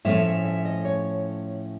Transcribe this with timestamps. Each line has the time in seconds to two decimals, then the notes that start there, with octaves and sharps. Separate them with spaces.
0.05 A2 F3 A3 C#4 E5
0.26 E5
0.45 E5
0.65 D#5
0.85 C#5